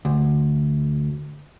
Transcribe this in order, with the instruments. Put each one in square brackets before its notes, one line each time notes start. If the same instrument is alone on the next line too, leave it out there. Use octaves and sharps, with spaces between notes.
[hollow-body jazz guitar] D2